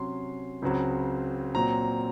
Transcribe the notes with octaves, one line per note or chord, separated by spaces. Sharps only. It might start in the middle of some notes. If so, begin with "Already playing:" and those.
Already playing: C3 F#3 C#4 C6
C#2 C#3 F#3 C4
A#2 F#3 C4 A#5